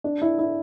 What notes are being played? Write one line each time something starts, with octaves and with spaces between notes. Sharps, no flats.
D4
E4
E4